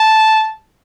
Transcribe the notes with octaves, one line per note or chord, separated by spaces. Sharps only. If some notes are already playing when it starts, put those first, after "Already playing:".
Already playing: A5